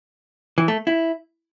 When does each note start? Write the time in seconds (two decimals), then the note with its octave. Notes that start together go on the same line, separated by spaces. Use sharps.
0.58 E3
0.68 A3
0.87 E4